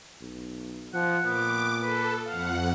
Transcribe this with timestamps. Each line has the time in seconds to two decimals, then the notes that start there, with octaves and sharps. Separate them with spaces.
0.21 B1
0.94 F3 F#5
1.25 A#2 B3 D6
1.82 A4 B4
2.27 F2 F5 F#5